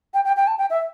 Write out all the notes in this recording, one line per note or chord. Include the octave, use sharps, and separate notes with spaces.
G5
G5
G5
A5
G5
E5